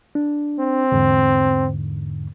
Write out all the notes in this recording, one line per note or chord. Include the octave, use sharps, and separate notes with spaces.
D4
C4
E2 G#2 D3